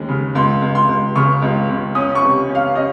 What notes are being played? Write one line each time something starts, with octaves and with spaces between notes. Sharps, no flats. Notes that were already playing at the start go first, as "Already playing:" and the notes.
Already playing: D#2 G#3 C#4
C#3
C#2 C6
C#2
C6
C#2
C#3 C#6
C#2
C#2
C#4 D#6
C#6
C3
C#4
F5
C#4 D#5